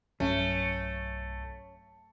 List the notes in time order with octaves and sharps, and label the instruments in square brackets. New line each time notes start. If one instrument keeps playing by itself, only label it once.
[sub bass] B1 [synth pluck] G2 F#3 [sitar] A3 [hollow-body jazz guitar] C#4